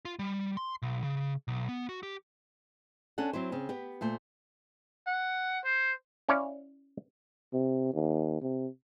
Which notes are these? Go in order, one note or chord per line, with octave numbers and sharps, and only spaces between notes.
F4
G3
C6
B1
C#3
B1
B3
F#4
G4
C#4 D4 A4 F#5
F#3 C4 E4 C5
C#3 C4
B3 G4
A#2 A3 C5
F#5
C5
C#4 E4 C#5 D5 F5
C3
D#2
C3